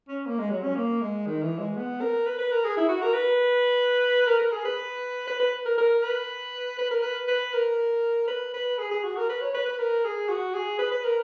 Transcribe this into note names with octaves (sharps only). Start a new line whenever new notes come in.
C#4
A#3
G#3
F#3
C#4
A#3
G#3
D#3
E3
G#3
B3
A#4
B4
B4
A#4
G#4
E4
F#4
A#4
B4
A#4
A#4
G#4
B4
B4
B4
A#4
A#4
B4
B4
A#4
B4
B4
A#4
B4
B4
G#4
G#4
F#4
A#4
B4
C#5
B4
B4
A#4
G#4
F#4
G#4
B4
B4
A#4